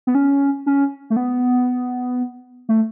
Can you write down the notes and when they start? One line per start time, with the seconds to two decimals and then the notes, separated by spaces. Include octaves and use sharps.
0.07 B3
0.15 C#4
0.66 C#4
1.10 A3
1.16 B3
2.69 A3